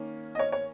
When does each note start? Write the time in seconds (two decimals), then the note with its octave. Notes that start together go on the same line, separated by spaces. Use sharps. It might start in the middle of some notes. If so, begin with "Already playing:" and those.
Already playing: D#3 A#3 C#4
0.35 D#5
0.39 C#5
0.52 C#5